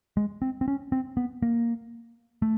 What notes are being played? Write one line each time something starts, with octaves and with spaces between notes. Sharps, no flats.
G#3
C4
C4
C#4
C4
B3
A#3
A3